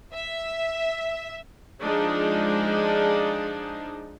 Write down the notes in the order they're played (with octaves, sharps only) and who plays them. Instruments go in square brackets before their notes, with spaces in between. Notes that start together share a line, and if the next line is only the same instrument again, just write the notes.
[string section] E5
[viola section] F3 G#3 D4 D#4 G#4